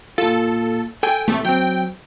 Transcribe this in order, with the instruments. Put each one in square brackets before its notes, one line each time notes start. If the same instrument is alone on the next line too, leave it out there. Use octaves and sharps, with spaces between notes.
[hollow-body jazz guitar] A#2 F4 [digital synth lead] A4
[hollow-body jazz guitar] A4 G#5 [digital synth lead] G5
[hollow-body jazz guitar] A2 C3 E3 [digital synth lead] A3
[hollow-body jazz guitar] F#3 C4 [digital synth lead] G5